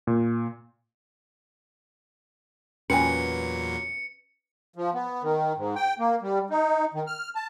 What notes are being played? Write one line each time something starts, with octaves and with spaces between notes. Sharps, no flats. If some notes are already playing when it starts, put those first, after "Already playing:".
A#2
E2 A#2 F#3 C#4 B4 G5 G#5 C#7
F3
B3
D#3
G#2
G5
A#3
G3
D#4
D#3
F6
A5